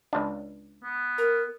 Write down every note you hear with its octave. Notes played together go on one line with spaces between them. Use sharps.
C#2 D4
B3
A#4